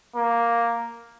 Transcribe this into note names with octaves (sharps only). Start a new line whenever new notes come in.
A#3